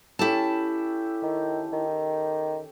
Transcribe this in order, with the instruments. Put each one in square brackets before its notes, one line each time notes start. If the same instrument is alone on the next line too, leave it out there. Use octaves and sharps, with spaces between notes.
[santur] C#4 G4 A4 [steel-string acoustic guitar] E4 A5
[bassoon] D#3
D#3